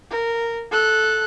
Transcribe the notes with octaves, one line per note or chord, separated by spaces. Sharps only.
A#4
A4 F#6